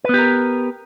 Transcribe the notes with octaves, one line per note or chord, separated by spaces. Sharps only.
B3 G4 A#4 B4